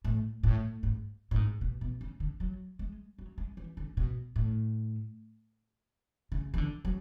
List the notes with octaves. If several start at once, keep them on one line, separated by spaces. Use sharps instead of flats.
A2
A2
G#2
A2
G#2
B2
B2
C#3
D3
F#3
G#3
F#3
G#3
E3
D3
B2
A2
C#3
E3
D3
F#3